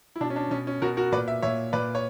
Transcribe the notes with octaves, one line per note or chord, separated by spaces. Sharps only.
E4
B2 D4
C#4
D4
B2 C#4
C#4
B2 F#4 A#4
F#4 A#4
A#2 B4 D5
E5
A#2 C#5 E5
A#2 B4 D5
C#5